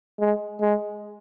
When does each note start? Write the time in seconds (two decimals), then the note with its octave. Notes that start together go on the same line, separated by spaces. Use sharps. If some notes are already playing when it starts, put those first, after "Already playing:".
0.20 G#3
0.61 G#3